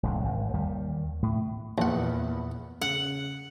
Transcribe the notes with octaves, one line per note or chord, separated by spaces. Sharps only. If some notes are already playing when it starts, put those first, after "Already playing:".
D#1 C2 G#2
G#1
D#2 D#3 G3
A2
A#1 E2 A#2 F#5
C#3 F#5